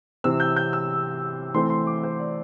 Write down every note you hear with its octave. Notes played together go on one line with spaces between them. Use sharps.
C3 E3 C4 E6
G6
G6
E6
E3 A3 C4 C6
C6
D6
C5
D5